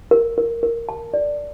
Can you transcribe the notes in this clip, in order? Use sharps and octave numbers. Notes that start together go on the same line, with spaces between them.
A#4
A#4
A#4
A5
D5